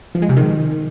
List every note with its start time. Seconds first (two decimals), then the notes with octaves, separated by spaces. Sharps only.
0.15 F3
0.22 G#3
0.29 C3
0.37 D#3